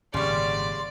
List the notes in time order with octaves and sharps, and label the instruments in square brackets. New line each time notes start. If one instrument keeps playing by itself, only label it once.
[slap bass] G#1 A#2 [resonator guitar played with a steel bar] C#3 G3 [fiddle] D5 [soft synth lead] C6